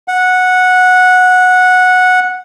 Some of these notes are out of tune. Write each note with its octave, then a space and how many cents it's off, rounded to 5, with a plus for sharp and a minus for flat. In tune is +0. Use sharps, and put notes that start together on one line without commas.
F#5 -10